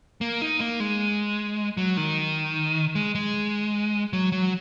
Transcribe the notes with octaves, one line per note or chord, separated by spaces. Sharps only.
A#3
D#4
A#3
G#3
F#3
D#3
G#3
G#3
F#3
F#3